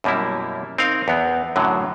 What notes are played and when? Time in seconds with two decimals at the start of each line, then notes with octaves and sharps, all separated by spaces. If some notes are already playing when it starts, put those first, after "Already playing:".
0.04 F#2 B2 G3 A#3 E4
0.78 C4 D#4 A#4 F5
1.08 E2 B3
1.56 F#2 A2 D3 F#3